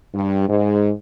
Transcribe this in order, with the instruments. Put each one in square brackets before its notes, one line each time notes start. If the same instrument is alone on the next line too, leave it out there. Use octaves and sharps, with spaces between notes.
[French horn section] G2
G#2